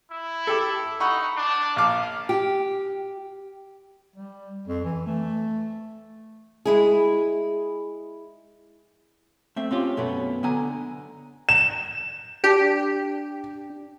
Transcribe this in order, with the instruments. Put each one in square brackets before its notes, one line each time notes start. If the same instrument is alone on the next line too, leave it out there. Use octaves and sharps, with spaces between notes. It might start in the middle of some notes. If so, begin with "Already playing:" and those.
[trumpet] E4
[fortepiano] G4 A4
[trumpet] D#4 [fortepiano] F#5 B5 C#6
[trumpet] D4
[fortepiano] A#1 D6 [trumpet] F5
[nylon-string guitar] G4
[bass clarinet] G3
F2
E3
A3
[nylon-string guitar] G#3 E4 G#4
[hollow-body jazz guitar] A3 C4 E5
C4 C#4 F4 G4
F#2 B2 A3 B3 C#4
D3 B3 G#5 A#5
[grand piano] E7
[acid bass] D4 [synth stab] G4